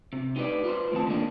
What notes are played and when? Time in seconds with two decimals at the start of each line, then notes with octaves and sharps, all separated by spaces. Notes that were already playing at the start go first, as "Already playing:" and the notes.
0.13 C3
0.36 D#4 G4 B4 D5
0.64 F4 B4 C5
0.92 A2 D#3 C4 A5
1.06 G2 D3 D#3 G#3 A#3 D4